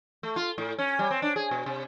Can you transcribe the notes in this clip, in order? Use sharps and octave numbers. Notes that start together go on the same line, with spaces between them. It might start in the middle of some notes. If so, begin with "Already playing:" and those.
A3
F4
A2
C#4
G3
C4
D4
G#4
B2
C3